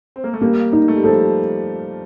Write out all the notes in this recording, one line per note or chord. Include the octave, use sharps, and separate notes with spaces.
C4
A#3
A3
G3 A#3
D#4
A3
G3
F3 A4
G3